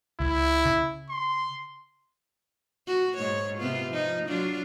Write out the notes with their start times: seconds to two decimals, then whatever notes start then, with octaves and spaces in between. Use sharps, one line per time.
0.20 C#2 E4
0.65 C#3
1.10 C6
2.87 F#4
3.17 G#2 C#5
3.59 C3 B3 F4
3.88 F3 D#4
4.26 F#3 D4 F4